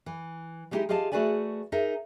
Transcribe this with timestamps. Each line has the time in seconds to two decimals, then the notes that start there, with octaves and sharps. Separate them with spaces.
0.06 E3
0.71 G3 G#3 D#4 E4 G4 G#4
0.89 F4 G4 G#4 D#5 F5 A5
1.12 A3 F#4 G#4 B4 D5 G#5
1.72 D#4 G#4 A#4 E5